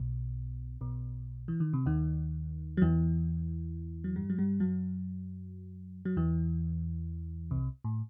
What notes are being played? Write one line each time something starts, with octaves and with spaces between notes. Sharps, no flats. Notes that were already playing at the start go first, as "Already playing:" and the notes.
Already playing: B1 B2
B1 B2
E3
D#3
C3
D#2 D#3
F#3
E2 E3
F#3
G2 G3
F#3
G2 G3
F#2 F#3
F#3
E2 E3
C2 C3
A2